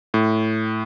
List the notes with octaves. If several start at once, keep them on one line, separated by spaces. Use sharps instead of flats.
A2